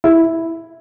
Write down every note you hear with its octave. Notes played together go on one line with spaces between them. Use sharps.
E4